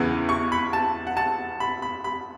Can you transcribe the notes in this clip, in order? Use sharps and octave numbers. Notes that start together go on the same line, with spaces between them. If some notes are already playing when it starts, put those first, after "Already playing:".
Already playing: E2 C#3 E3 B3
C#6
B5
A5
F#5
A5
B5
B5
B5